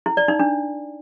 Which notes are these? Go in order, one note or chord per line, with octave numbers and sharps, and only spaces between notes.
E4
D5
D#4
D4